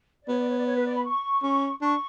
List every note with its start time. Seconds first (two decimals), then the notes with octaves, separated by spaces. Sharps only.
0.23 D5
0.28 B3 C#5
0.38 D5
0.47 C#5
0.57 D5
0.67 C#5
0.76 B4
0.85 D5
0.95 B5
1.04 C#6
1.43 C#4
1.81 D4 C#6